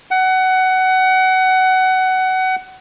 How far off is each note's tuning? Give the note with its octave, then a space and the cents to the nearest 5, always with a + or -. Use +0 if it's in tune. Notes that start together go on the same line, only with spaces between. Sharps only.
F#5 +20